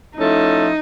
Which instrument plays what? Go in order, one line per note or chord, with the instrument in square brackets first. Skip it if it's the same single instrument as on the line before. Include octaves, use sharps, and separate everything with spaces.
[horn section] F3 A3 C#4 E4 A4 [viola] D#4